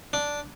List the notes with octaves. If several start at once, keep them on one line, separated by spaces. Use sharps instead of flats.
D4